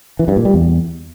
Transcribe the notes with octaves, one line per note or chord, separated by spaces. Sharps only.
E3
G2
A#2
G3
E2